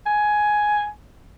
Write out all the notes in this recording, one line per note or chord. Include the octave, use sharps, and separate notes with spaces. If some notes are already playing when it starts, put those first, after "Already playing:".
G#5